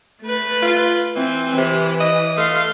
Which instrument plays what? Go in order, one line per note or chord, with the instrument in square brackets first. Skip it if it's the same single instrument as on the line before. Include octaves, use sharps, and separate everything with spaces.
[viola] A3 B4
[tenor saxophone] F4
[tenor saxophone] E3 [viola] C4
[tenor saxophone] C3 [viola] E3
[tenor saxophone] D#5
[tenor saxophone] A3 [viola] F5 C6